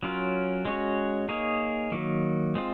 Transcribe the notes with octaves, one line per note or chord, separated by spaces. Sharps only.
F#3 C#4 F4 A#4
G#3 C#4 F#4 C#5
A#3 D#4 G#4 C#5
D#3 F#3 A#3
G#3 C4 F4